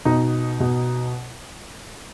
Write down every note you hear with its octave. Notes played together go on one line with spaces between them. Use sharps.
B2 D#4
B2